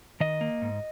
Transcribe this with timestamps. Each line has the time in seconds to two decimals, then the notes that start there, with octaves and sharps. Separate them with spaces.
0.20 D#3 D#5
0.41 A#3
0.62 G#2